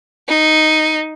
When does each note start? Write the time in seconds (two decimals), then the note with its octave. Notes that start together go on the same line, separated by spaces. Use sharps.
0.29 D#4